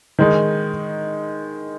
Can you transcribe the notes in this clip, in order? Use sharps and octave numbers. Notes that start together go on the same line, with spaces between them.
D#3 G#3 D#4